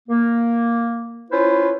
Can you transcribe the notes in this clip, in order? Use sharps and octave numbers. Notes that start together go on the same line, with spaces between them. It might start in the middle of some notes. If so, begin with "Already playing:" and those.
A#3
C#4 E4 F4 B4 C5